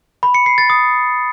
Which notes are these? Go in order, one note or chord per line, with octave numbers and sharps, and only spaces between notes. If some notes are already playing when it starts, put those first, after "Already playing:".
B5
C#7
C7
A6
D#6